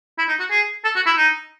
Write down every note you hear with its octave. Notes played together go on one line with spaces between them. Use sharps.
E4
D#4
F#4
G#4
A4
F#4
E4
D#4